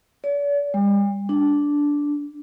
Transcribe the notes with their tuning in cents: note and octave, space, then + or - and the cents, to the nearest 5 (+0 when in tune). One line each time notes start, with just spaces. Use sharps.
D5 -45
G3 +45
D4 -10